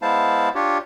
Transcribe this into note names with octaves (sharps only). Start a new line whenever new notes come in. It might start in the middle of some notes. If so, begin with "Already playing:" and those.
G#3 B3 E4 C5 F5 A5
D4 F4 G4 C#5